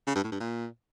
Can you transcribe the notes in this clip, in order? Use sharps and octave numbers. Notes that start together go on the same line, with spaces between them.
C#3
G2
A2
G2
A#2